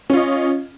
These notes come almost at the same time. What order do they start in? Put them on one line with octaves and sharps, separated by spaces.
C#4 F4 D#5